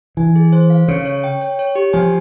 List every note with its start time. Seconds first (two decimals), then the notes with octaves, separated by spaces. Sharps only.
0.17 E3 G#5
0.35 G#4
0.53 C5
0.70 F5
0.88 C#3 C#5
1.05 C#5
1.24 G5
1.41 C#5
1.59 C#5
1.75 G4
1.93 F3 G#5